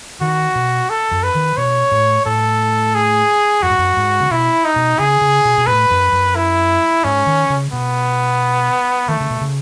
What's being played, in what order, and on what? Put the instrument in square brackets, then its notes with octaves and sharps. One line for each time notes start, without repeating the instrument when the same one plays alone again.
[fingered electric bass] D#3 [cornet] F#4
[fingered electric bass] B2
[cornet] A4
[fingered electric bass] F#2
[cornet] B4
[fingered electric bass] D#3
[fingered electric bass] B2 [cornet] C#5
[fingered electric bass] A2
[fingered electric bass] A2 [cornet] A4
[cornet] G#4
[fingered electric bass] F#2 [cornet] F#4
[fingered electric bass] G#2
F#2
G#2
C#3
[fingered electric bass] B2 [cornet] E4
[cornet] D#4
[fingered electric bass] B2
[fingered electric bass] C#3 [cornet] G#4
[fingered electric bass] C#3
B2
B2
[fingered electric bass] A2 [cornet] B4
[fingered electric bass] F#2
F#2
[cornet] E4
[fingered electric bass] G#2 [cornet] C#4
[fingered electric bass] D#3
C#3
[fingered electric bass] B2 [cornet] B3
[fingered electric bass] D#3 [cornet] A3
[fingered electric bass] C#3
B2
C#3